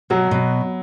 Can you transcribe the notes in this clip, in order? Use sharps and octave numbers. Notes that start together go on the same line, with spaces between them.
B2 F#3
B2